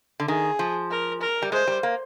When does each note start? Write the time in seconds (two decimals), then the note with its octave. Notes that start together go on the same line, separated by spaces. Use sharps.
0.20 D3
0.28 D#3 G#4
0.59 F3
0.90 A#4
1.21 A#4
1.42 G3
1.52 G#3 C5
1.67 G3
1.83 A#3